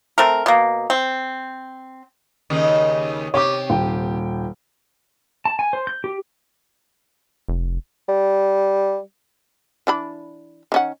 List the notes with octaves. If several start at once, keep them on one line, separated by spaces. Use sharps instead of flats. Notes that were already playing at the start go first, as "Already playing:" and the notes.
A3 C4 A#4
B2 A#3
C4
D#2 C#3 D#4
C3 G4 C#5 D6
D#1 G5
A5
G#5
C5
G6
G4
F1
G3
E3 D4 B5
D#3 C#4 F#5